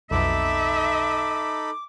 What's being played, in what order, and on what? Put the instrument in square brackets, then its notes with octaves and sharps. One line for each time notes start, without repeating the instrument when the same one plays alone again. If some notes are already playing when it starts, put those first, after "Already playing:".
[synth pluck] B1 F2 B2 [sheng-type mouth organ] D#4 A4 B5 [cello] E5 [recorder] D6